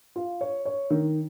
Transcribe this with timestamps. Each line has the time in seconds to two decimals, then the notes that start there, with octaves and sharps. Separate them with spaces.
0.16 F4
0.41 C#5
0.65 C#5
0.90 D#3